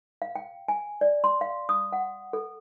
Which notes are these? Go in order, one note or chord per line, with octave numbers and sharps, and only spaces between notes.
F5
G5
G#5
D5
C6
F5
D#6
F#5
A4